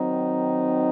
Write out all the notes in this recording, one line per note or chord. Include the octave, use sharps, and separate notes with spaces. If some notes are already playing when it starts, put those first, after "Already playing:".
Already playing: D#3 F#3 C4 D#4